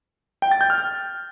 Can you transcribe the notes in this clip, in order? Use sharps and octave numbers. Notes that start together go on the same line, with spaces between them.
G5
A6
G6
F6